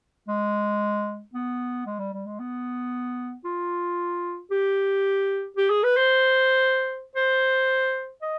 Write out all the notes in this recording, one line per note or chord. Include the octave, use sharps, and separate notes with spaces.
G#3
B3
G#3
G3
G3
G#3
B3
F4
G4
G4
G#4
B4
C5
C5
D#5